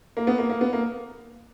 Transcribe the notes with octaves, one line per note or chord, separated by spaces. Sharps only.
A#3
B3
A#3
A#3
B3
A#3